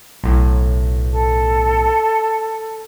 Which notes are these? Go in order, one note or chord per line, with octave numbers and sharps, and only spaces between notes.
B1 A2
A4